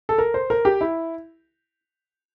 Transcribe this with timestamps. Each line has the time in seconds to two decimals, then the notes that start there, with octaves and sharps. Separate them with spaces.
0.09 A4
0.18 A#4
0.34 C5
0.50 A#4
0.65 G4
0.81 E4